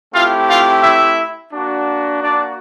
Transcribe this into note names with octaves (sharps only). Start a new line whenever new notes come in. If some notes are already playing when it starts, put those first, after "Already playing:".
A3 C4 E4 F4 G4 F5
F4 F5
E4 E5
A#3 D4 F#4
D4 D5